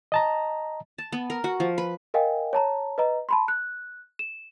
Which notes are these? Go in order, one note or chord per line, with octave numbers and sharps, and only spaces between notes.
D#5 A5 A#5
A5
B3
A#4
F#4
F3
B4
A#4 D#5 F5 G5 G#5
C#5 A5 A#5
B4 D#5 A#5
A5 B5 C6
F#6
E7